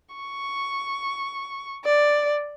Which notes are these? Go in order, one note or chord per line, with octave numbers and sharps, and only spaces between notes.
C#6
D5